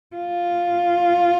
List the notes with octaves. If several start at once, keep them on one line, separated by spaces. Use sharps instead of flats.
F4